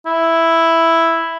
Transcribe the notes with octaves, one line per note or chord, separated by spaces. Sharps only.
E4